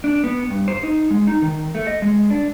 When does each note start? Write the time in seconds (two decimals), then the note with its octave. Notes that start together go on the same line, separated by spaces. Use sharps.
0.04 D4
0.24 B3
0.51 G2
0.68 C5
0.83 D#4
1.11 G#3
1.27 D#4
1.42 D#3
1.75 A3
1.87 D#5
2.02 G#3
2.30 D4